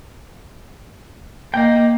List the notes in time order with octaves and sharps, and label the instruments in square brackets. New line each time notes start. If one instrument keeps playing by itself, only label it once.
[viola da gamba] A#3 [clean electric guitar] D#5 G5